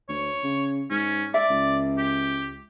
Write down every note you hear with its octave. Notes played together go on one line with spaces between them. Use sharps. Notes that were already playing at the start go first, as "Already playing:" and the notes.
D2 C#5
C#3
G#2 C#4
D5 E5
C#2
G4